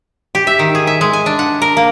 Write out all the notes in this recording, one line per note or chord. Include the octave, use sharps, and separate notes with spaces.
G4
E5
D#3
G#4
E5
G#3
G#5
D4
F#5
A#4
A#3